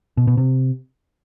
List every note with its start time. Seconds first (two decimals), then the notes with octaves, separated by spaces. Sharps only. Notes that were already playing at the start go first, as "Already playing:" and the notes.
0.17 B2
0.27 B2
0.37 C3